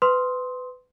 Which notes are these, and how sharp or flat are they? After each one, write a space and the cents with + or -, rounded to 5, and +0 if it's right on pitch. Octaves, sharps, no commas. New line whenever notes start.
B4 +25 C6 +0 D#6 +30